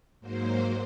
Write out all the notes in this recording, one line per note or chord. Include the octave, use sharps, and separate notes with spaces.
G#2 F#3 A#3 C5